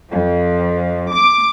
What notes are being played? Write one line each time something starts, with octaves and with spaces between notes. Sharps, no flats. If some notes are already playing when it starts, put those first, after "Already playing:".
F2
D6